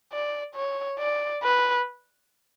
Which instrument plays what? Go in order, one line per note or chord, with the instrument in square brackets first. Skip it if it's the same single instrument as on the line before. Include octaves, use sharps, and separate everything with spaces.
[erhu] D5
C#5
D5
B4